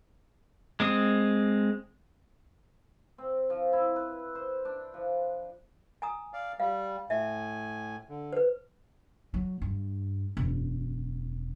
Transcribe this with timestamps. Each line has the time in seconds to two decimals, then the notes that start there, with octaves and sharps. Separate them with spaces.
0.80 G#3 C4 D#6
3.18 C4
3.50 F3
3.73 E4
3.96 B4
4.35 C5
4.65 D4
4.94 F3
6.02 G#5 A#5 D#6
6.33 D5 F5
6.60 G3 F5
7.10 A2 E5 G#5
8.09 D3
8.33 B4 C5
9.34 F#3
9.62 G2
10.37 E1 F#2